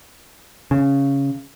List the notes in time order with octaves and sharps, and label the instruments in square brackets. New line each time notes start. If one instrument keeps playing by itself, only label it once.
[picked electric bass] C#3